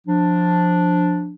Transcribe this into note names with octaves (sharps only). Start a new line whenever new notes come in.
F3 D4